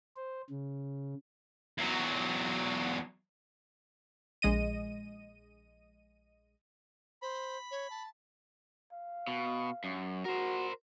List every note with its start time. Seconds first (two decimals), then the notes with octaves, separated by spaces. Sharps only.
0.16 C5
0.50 C#3
1.78 E2 F#3
4.42 A#1 G#3 D#5 D#7
7.22 C5 B5
7.71 C#5
7.90 A5
8.92 F5
9.27 B2
9.84 F#2
10.25 F#4 A#4 C5